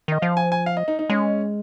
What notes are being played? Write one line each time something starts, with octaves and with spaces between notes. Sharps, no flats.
D#3 D#5
F3 F5
G#5
G#5
F5
D#5
D#4
D#4
G#3 C#4